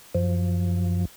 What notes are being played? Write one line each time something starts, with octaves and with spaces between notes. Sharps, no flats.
F#2 F3